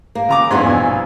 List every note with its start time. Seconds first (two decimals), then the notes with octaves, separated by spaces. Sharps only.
0.15 A#3
0.29 C#3 A#5 D6
0.51 E2 G2 F3 D#4 E4 F#5 C6 G#6
0.64 A#1 B2 G#5